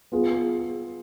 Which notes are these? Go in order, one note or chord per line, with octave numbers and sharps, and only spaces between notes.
B3 F4 G#4